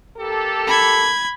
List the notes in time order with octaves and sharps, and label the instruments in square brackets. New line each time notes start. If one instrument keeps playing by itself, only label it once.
[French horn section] A#3 G4 A4
[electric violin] B5 G#6